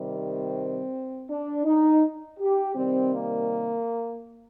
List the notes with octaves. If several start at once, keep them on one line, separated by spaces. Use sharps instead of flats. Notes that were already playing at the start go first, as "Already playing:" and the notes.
Already playing: C3 D#3 G3
C4
D4
D#4
G4
C3 D#3 G3 C4
A#3